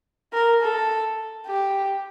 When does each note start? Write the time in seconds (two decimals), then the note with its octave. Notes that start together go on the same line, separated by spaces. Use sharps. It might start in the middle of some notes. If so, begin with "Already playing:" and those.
0.34 A#4
0.62 A4
1.47 G4